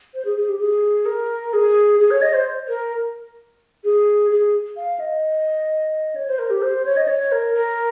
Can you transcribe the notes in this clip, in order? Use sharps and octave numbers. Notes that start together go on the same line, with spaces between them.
C5
G#4
G#4
G4
G#4
A#4
G#4
G#4
C#5
D#5
C5
A#4
G#4
G#4
F5
D#5
C#5
C5
A#4
G4
C5
C#5
D#5
C#5
A#4
A#4